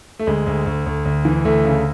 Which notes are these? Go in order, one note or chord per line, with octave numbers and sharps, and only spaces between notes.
A3
D2 G#3
D2
D2
D2
D2
E3
D2 A3
C#3